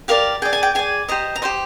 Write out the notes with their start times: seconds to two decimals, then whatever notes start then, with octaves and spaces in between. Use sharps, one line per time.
0.08 G4 A#4 D5 F5
0.42 G#4 D5 G5
0.53 G#5
0.63 G5
0.75 G#4 D5 G#5
1.08 G4 C5 D#5 A#5
1.36 A#5
1.42 G4 C5 D#5 C6